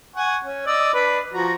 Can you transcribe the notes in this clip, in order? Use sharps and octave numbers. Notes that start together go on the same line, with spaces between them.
F#5 G#5 C#6
C#4
D5 D#5 E6
D4 B4 B5
F3 F#4 A#5